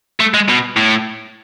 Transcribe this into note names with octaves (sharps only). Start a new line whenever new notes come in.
A3
G#3
B2
A2